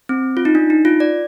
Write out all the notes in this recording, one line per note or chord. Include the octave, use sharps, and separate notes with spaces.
C4
F4
D#4
D4
D#4
F4
D5